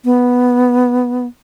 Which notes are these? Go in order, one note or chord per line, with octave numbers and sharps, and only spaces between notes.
B3